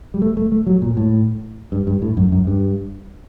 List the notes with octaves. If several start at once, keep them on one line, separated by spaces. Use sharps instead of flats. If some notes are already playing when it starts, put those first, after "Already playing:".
G3
A3
A3
A3
F#3
A#2
A2
G2
G2
A2
F#2
F#2
G2